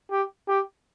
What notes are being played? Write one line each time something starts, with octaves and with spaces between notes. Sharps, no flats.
G4
G4